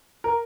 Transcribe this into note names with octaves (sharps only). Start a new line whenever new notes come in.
A#4